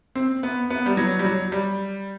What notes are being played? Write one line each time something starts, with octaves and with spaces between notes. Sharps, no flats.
C4
B3
B3
G3
F#3
G3
F#3
G3